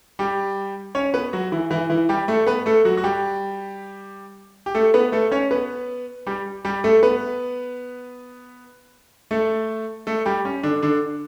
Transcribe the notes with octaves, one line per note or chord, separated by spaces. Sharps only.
G3 G4
C#4 C#5
B3 B4
F#3 F#4
E3 E4
E3 E4
E3 E4
G3 G4
A3 A4
B3 B4
A3 A4
F#3 F#4
F#4
G3 G4
G4
A3 A4
B3 B4
A3 A4
C#4 C#5
B3 B4
G3 G4
G3 G4
A3 A4
B3 B4
A3 A4
A3 A4
G3 G4
C#4
D3 D4
D3 D4